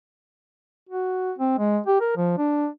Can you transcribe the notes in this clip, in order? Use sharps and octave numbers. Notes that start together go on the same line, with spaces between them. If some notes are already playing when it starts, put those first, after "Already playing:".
F#4
C4
G#3
G4
A#4
F3
D4